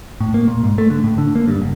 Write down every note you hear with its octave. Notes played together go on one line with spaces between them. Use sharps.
A2
A#3
A#2
G#2
A3
D3
A2
D3
A#3
G2
F#1